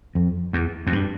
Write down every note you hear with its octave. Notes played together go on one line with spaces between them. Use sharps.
F2
E2
F2
G2